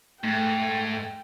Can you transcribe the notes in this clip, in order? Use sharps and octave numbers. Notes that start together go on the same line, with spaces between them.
G#2 A3 G5